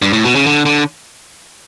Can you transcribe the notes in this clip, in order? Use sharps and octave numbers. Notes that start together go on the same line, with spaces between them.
G2
A2
B2
C#3
D3
D3